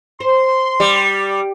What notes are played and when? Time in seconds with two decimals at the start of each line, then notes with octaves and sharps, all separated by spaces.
0.20 C5 C6
0.80 G3